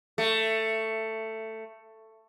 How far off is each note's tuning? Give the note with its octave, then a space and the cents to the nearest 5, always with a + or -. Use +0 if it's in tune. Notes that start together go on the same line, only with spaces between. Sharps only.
A3 +10